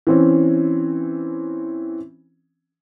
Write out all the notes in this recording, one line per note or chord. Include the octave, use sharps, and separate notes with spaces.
E3 C4 C#4